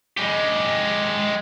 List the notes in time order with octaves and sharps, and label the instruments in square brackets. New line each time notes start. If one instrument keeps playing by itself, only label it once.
[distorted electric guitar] G#3 G4